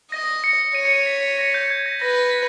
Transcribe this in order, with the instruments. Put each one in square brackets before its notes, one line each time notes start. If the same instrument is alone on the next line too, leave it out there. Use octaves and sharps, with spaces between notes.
[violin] D#5 [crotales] A#6
[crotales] C#7
[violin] C#5 [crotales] D#7
[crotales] C#7
D#7
B6
A#6
G6
G#6
A#6
[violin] B4 [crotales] A#6